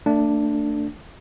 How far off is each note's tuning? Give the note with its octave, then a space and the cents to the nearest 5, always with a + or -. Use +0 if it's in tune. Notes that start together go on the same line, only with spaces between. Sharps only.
A3 +30 D4 +0